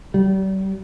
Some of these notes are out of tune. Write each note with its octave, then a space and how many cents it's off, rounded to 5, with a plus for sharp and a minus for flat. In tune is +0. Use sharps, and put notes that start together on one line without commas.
G3 -40